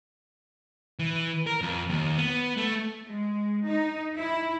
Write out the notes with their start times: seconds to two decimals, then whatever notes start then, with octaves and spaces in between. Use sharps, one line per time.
0.99 E3
1.47 A#4
1.61 F2
1.89 D#2
2.18 B3
2.57 A3
3.08 G#3
3.65 D#4
4.18 E4